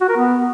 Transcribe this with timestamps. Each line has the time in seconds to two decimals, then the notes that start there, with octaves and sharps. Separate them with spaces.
0.01 F#4
0.09 A#4
0.17 B3